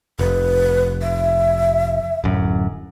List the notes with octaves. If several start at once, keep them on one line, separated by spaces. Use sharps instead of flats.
F1 B4
E5
D1 F#2